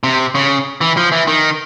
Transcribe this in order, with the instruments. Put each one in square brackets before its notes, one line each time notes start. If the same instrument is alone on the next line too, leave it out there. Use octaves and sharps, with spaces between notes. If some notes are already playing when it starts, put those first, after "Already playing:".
[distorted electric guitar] C3
C#3
E3
F3
E3
D#3